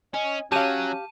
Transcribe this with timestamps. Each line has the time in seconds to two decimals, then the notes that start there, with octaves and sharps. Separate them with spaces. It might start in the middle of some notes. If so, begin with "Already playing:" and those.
0.14 C#4 D#5 G#5
0.52 F#3 C#4 G4 F5 A5 D#7